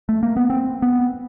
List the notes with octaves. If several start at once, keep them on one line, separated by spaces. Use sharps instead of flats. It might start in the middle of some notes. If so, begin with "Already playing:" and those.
A3
A#3
B3
C4
B3